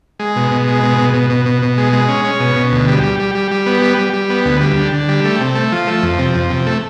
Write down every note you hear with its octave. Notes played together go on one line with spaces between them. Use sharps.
G#3
B2
B2
G#3
B2
B2
B2
B2
B2
B2
G#3
G#3
C#4
C#4
B2
B2
D2
G3
G3
G3
G3
G3
B3
G3
G3
G3
B3
D2
G3
D3
D3
G3
A3
C3
A3
F3
A3
F2
C3
F2
C3
A3